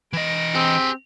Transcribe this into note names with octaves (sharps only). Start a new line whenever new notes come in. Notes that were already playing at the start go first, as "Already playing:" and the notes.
E3 D#5 A#6 D7
C4 G4 G#4